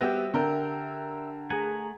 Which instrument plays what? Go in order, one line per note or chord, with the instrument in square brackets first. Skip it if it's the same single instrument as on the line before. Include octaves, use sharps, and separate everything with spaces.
[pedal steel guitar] G3 C4 F#4 [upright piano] B3 G4 [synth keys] E5 E6
[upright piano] D3 A#4 [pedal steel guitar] G4 G5
[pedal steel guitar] A3 F#5 G#5 [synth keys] G#4 A#5